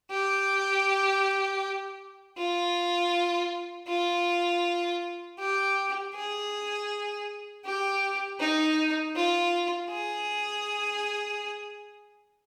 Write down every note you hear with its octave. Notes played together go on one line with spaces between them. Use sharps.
G4
F4
F4
G4
G#4
G4
D#4
F4
G#4